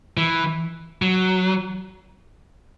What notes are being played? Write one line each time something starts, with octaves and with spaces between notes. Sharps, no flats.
E3
F#3